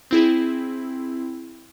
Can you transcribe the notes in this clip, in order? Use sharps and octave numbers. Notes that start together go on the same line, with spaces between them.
C4 E4 G#4